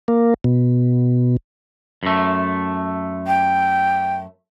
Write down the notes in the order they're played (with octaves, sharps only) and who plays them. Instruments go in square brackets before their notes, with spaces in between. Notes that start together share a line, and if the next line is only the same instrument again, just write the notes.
[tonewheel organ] A#3
B2
[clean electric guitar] F#2 A3
[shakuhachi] G5